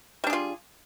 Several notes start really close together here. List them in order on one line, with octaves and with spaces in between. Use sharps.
G3 D4 G#4 F4